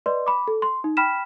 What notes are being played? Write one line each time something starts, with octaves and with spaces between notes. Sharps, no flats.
B4 D5 D#5 C6
B5 D6
A4
C6
D#4
G5 B5 F6 B6 E7